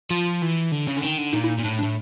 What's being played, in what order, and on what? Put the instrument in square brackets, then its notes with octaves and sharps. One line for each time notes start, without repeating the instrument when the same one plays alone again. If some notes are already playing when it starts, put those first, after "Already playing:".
[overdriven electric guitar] F3 [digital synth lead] F4
[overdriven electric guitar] E3
D3
C#3
D3
D#3
D3
[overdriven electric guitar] A#2 [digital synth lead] D#4
[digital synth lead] E4
D#4
[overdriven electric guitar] A#2
[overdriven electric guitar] A2 [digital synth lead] D4
[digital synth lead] D4
[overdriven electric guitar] A2